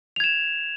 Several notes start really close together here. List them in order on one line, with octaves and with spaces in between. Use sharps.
F7 G#6 E7